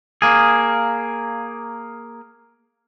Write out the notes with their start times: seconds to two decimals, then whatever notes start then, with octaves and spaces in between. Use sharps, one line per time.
0.22 A#3 G#4